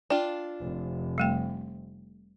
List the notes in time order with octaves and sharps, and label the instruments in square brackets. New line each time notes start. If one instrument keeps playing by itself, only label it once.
[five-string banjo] D4 F4 [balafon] G5
[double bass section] F1
[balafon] G3 A3 G5